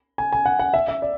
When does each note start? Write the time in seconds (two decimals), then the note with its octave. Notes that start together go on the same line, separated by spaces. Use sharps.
0.18 G#5
0.32 G#5
0.45 F#5
0.59 F#5
0.74 E5
0.88 E5
1.02 D5